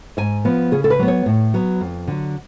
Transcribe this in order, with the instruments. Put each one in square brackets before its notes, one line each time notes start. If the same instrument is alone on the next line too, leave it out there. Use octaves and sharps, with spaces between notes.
[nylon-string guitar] G#2 G#5
F3 B3
C#3 G#4
A4
B4
F#3 B3
C#5
A2
F#3 B3
F2
D3 F#3